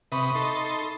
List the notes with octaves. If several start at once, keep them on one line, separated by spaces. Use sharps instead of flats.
C3 B4 E5 B5 C#6 D#6
D#4 A4 C6